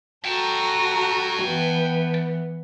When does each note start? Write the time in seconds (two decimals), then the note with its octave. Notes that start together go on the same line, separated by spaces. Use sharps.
0.25 F#4 A4 G5 A5 A#5
1.43 E3 B3